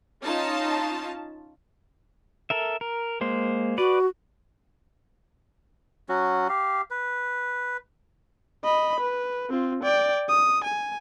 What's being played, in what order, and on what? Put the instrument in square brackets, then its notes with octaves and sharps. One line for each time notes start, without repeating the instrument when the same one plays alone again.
[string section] C#4 D#4 F4 A5
[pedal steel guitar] A4 A#4 E5
A#4
G#3 A#3 C5
[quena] F#4 [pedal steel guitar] B4 D5
[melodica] F#3 C#4 F#4
G4 F5
B4
[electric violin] D#5 B5
B4
C4 F4
D5 G5
D#6
G#5